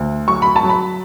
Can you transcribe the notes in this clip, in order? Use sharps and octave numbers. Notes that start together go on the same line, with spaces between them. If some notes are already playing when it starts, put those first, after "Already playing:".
Already playing: D2
F#3 C#6
B5
A5
F#3
B5